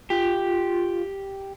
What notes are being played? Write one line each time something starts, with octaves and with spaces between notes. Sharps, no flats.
F4 G4